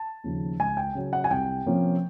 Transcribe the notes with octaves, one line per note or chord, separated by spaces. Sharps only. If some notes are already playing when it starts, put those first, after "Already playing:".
Already playing: A5
D#2 C#3 F3
C#2 G#5
G5
C#3 F#3
F#5
G#5
C2 G5
C3 F3 A#3 C#4